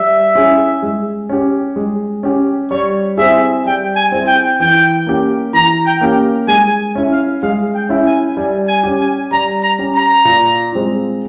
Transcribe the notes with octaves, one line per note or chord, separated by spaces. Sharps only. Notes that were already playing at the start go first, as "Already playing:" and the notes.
Already playing: G3 E5
C#4 E4 G#4
G#3
C#4 G4
G#3
C#4 G4
G3 C#5
C4 E4 G#4 E5
G3 G5
G#5
C4 E4 G#4
G5
E3 G5
A#3 C#4 G4
E3 A#5
G5
A#3 C#4 G4
G#3 G#5
C#4 E4
F5
G#3 F5
G5
C#4 E4
G#5
G3 G#5
G#5
C#4 G4
G#5
G3 A#5
A#5
C#4 G4
A#5
A#2
G#3 C4 F4